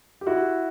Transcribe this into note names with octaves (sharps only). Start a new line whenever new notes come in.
G4
E4 F#4